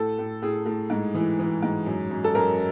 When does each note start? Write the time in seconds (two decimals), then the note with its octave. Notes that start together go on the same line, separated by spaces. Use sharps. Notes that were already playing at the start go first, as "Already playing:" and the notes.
Already playing: A2 A4
0.18 A2
0.42 A2 G#4
0.66 A2
0.90 G#2
1.14 E3
1.39 E3
1.63 G#2
1.86 F#2
2.11 F#2
2.24 A4
2.35 F#2 A#4